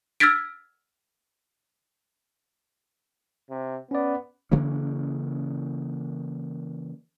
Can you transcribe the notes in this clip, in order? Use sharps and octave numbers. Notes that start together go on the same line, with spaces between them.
E6 F6 G#6 A6 B6 D7
C3
B3 C#4 D5
C#3 E3 A#3 C#4